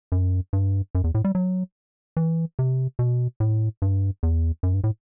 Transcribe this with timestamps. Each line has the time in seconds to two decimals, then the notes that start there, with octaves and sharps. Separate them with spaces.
0.12 F#2
0.53 G2
0.95 F#2
1.04 E2
1.15 A2
1.24 G3
1.35 F#3
2.17 E3
2.59 C3
2.99 B2
3.40 A2
3.82 G2
4.23 E2
4.63 F#2
4.73 G2
4.84 A2